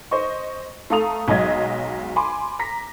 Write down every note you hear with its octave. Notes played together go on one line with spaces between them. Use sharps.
C5 D#5 C#6
A3 A4 F5 A#5 D#6 F7
B1 F#3 G#3 D#5 G#6
G#5 B5 C6 D6
A#5 A#6 B6